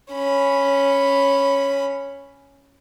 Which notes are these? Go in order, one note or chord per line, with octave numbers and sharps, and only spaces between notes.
C#4 B5